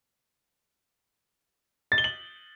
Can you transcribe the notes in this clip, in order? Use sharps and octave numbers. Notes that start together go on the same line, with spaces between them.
A6
G7
F#7